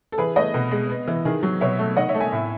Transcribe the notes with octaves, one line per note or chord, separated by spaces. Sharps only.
A4
E3 G#4 B4
A3 B4 D#5
B2
G#3
B3
E3
D#3 G#4
F#3
B2 C#5 E5
A3
D#3 D#5 F#5
C#5 E5
A3
E5 G#5
A2